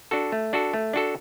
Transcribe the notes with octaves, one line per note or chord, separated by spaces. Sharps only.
D4 F#4 A4
A3
D4 F#4 A4
A3
D4 F#4 A4